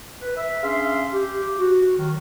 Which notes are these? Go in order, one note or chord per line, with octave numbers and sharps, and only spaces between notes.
B4
E5
C#4 D4 G#4 E5 F5 C6
G4
F#4
D#3 F#3